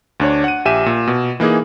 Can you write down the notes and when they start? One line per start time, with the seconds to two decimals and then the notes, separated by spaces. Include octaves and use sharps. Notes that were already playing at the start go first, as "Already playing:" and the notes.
0.20 D2 D4 C#5
0.44 F#5 D#7
0.65 A#1 G4 E5 G#5 D#7 E7
0.86 A#2
1.07 B2
1.40 E3 A#3 D#4 G#4